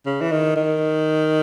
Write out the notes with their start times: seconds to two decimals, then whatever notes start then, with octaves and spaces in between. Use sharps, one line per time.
0.06 C#3
0.21 E3
0.31 D#3
0.56 D#3